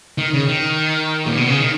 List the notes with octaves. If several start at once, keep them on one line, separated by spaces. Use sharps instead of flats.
D#3
C#3
D#3
A#2
B2
C#3
D#3